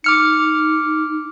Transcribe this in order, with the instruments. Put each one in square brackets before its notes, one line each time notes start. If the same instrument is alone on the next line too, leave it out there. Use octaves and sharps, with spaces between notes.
[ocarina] D#4 [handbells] D6 F6 C#7